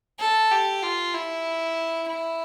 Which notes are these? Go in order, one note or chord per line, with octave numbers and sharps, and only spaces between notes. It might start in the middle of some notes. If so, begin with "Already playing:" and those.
A4
G4
F4
E4
E4